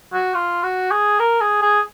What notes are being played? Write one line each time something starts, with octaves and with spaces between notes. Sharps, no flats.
F#4
F4
F#4
G#4
A#4
G#4
G#4